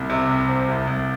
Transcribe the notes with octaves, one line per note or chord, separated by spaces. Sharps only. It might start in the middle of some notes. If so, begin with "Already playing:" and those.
Already playing: C2
C3
C2
C4
C2
C2